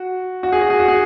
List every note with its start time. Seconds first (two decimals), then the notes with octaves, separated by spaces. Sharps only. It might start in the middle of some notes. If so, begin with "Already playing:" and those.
Already playing: F#4
0.43 F#4
0.52 G#4
0.61 F#4
0.70 G#4
0.80 F#4
0.88 G#4